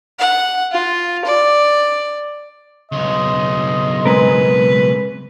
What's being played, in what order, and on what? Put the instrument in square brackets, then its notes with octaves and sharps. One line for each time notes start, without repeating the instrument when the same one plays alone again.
[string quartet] F#5
F4
D5
[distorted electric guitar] B1 C#3 [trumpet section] D#5 C6
[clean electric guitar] G#3 C4 A#4 [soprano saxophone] B4